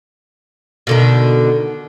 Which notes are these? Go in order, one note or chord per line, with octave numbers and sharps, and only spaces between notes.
B2 D3 D#3